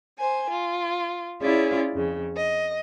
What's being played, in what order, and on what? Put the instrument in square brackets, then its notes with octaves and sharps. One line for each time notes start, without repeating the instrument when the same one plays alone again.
[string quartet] C5 G#5
F4
C#4 E4 F4 G#4 C#5 D5
F2 C#3
D#5